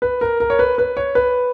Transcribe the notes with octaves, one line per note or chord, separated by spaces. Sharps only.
B4
A#4
A#4
C#5
B4
B4
C#5
B4